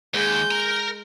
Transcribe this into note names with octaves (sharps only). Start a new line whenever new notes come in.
D#2 G#3 D#5 F#5 G6
A#4 A#5